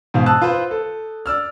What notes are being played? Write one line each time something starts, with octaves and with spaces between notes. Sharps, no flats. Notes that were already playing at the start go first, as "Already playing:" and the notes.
G#2 B2 C5 F5
A5 D#6 E6 F#6
F4 B4 C5
A4
D5 E6 F6